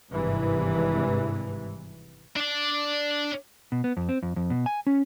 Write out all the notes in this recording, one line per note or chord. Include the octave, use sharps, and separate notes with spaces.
G#1 G2 C3 E3 G#3
D4 D5
B2
B3
F2
C4
F2
F2
B2
G#5
C#4